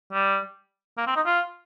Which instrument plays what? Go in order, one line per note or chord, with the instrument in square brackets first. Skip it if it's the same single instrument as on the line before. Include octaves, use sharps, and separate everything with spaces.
[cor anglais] G3
A#3
C4
D#4
F4